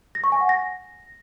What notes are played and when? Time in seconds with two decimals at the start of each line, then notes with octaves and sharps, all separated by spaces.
0.15 A#6
0.24 C#6
0.32 G#5
0.41 F#5
0.49 A#6